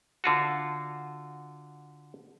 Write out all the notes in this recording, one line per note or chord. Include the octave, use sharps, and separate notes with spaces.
D3 F4 F#4